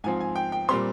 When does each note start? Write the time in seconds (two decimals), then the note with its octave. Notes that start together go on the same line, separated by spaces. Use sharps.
0.04 G#2 F3 C4 G#5
0.21 G#5
0.36 G5
0.52 G5
0.68 A#2 G3 C4 C6